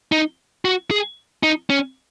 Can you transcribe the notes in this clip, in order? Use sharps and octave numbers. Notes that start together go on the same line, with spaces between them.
D#4
F#4
G#4
D#4
C#4